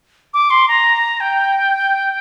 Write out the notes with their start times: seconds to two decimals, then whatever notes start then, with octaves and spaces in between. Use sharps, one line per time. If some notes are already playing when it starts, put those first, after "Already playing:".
0.34 D6
0.50 C6
0.68 A#5
1.20 G5